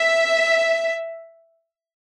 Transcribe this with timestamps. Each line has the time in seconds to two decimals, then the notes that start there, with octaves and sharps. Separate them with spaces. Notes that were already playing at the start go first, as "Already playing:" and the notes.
Already playing: E5